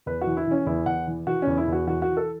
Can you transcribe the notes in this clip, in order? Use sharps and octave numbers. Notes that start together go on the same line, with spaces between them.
E2 B4
F#4
E3
E4
E3 C#4
E2 E4
E2 F#5
E3
E3 F#4
E2 C#4
E4
E2
F#4
E3 F#4
F#4
E3
A4